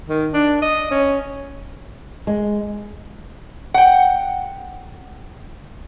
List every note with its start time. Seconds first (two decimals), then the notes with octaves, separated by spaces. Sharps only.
0.09 D#3
0.34 D4
0.62 D#5
0.91 C#4
2.27 G#3
3.74 F#5 G5